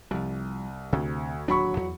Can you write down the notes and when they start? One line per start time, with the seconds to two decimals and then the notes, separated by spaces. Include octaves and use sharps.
0.11 C2 F3 G3
0.93 D2 C3
1.48 D1 D#2 F#3 D4 B5 C#6
1.77 E2